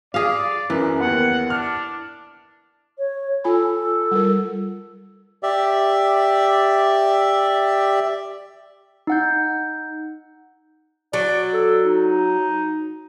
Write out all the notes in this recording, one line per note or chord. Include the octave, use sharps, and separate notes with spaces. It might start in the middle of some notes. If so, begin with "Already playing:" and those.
G#4 D5 F5
F#2 E3
D#2 B3 F#5
D4 F6
C#5
F4 A4 G#5 B5
G3 F4 A#4
G4 D5 E5
D#4 F#5 G6
F#3 D5
A4
D#4